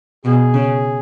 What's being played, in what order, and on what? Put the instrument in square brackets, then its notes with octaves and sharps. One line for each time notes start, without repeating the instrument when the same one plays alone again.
[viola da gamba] B2 [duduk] G#4
[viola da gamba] C#3